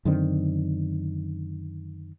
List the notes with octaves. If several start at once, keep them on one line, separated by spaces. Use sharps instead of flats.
F#2 D3 D#3 C4